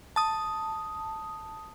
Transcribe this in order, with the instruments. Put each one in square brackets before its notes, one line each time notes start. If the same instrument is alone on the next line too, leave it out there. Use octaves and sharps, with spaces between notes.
[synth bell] A5 D#6